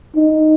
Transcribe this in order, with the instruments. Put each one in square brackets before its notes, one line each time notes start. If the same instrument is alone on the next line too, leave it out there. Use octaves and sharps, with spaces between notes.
[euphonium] D#4